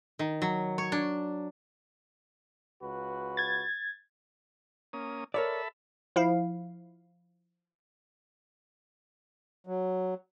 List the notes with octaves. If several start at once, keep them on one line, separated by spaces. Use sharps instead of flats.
D#3
F#3
C#5
D4
C#2 F#4 B4
G#6 A6
A#3 C#4 D#6
A4 A#4 C#5 D5 E5 B5
F3 E4 F5
F#3